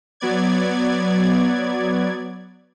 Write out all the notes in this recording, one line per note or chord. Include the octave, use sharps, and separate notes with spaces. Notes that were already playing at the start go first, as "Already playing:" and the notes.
F#3 B3 D5 G#6